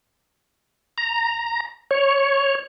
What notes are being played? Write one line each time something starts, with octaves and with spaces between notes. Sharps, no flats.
A#5
C#5